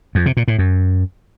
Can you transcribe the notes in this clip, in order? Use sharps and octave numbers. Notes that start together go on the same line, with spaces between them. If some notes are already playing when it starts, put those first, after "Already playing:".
F2
C3
A#2
A2
F#2